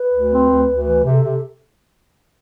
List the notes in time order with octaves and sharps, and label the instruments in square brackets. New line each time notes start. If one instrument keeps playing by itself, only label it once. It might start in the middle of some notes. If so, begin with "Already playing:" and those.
Already playing: [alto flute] B4
[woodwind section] D2
C4
D2
D2
[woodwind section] E3 [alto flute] B4
[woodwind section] C3 [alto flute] G4
[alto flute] A4
[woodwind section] C3